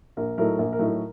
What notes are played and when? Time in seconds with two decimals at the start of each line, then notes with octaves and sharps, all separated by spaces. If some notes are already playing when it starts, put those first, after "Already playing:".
0.17 A#1 A#4
0.38 A2 F#3 A3 D#4 A#4
0.58 A#1 A#4
0.73 A#4
0.79 A2 F#3 A3 D#4
0.86 A#4